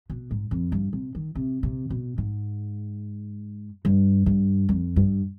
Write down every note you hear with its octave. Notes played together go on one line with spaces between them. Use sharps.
B2
G#2
F2
G2
C3
D#3
C3
C3
B2
G#2
G2
G2
F2
G2